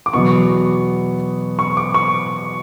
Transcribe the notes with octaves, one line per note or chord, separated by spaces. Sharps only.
D6
E2 B2 F#3 B3 C#6
C#6
D6
C#6